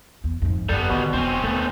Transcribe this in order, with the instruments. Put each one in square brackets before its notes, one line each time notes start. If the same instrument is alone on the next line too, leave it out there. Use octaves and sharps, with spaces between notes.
[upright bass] E2
F2 G#2
[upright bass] G1 F#2 [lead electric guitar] G3 B3 [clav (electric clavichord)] A4
[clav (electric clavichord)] B2 [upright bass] D3 D#3
[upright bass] E1 E2 [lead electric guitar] C4 C#4
[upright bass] D#2 [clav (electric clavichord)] A3 B3